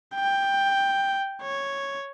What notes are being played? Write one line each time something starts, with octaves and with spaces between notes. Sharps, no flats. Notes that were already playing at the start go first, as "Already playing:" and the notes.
G5
C#5